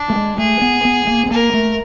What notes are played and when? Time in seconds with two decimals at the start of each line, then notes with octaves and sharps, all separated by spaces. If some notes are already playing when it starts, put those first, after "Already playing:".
Already playing: D4
0.10 A3
0.16 G#3
0.38 A3 G#4
0.62 B3
0.85 B3
1.07 A#3
1.26 B3
1.31 A#3 A#4
1.54 A3